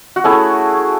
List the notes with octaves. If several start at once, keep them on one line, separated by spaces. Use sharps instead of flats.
F#4
A3 C#4 E4 G#4